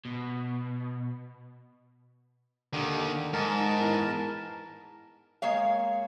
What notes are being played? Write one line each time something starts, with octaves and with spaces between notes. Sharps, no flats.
B2
D#2 D3 D#3
G#2 A#4 A5
D#3
E2
G#3 A#3 C#5 F5